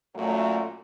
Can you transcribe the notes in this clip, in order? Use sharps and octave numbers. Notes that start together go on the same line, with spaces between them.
F#2 A#2 F#3 A3